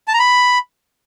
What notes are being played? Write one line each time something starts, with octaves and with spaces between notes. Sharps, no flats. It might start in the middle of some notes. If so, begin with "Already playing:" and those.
A5
A#5
B5